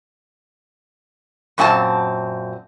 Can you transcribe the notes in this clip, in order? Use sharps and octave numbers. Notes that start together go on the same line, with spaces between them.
F#2 A#2 C4 G#5 A5